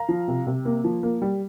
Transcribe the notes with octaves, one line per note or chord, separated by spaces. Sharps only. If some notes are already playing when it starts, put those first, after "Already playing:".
Already playing: F5 A#5
F3
C3
C3
A#3
F3
A#3
G3